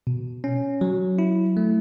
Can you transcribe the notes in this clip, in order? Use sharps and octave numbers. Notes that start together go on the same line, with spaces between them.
B2
C#4
F#3
E4
A3